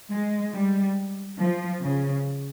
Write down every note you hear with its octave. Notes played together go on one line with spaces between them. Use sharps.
G#3
G3
F3
C#3